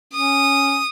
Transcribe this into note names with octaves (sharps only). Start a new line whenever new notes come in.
C#4 D#6